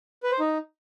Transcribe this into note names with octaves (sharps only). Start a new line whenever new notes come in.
B4
C5
D#4